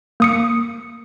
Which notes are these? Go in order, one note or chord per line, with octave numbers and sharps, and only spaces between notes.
A#3 D#6 C#7